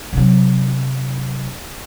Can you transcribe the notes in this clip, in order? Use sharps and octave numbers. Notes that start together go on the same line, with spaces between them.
C3 F#3